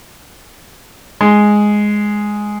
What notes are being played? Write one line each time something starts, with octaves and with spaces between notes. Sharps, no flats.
G#3